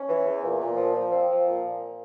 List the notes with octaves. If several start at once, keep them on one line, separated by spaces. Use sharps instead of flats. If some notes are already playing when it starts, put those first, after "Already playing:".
Already playing: C#4
E3
E2
A#2
A#2
F3
F3
C4
F3
A#2
A#2